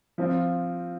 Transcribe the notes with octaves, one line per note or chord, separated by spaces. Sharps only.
F3 C4 F4